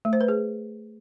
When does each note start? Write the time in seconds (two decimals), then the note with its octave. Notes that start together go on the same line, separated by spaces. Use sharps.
0.05 A3
0.13 C5
0.21 B4
0.28 G#4